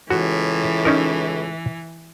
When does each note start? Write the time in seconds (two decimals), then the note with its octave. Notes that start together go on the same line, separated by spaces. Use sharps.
0.10 C#2 A2 E3 F#4
0.85 C#4 D#4 A#4